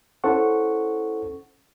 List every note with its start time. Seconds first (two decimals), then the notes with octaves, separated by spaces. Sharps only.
0.24 C#4 E4 A4 C5 F#5 C#6